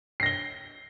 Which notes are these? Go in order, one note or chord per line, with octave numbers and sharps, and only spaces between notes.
A#6 C7 G7